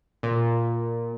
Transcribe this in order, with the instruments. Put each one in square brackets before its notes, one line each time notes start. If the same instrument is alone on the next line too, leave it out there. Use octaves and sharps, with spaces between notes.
[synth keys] A#2